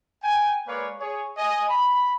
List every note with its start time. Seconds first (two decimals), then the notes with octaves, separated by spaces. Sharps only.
0.23 G5 G#5
0.67 G#3 A#3 B4 C#5 D5 F5
1.00 G#4 C#5
1.38 D#5 G#5
1.69 B5